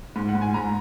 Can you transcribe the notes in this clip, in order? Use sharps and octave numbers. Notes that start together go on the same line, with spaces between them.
G#2
F#5
G#2
G#5
G#2 A#5